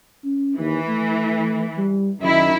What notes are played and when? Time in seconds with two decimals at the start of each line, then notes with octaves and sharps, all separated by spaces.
0.24 C#4
0.59 D#2 E3
0.88 A3
1.78 G3
2.21 F#2 D#3 E4